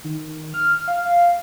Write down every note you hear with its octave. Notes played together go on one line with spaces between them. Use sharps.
D#3
F6
F5